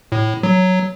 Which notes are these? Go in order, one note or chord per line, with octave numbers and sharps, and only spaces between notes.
A2
F#3